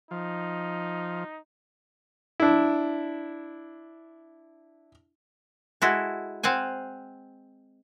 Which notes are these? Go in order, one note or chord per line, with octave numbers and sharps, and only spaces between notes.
F3 D#4
D4 E4
G#3 E4 F#4 A4
C4 F5 F#5 G#5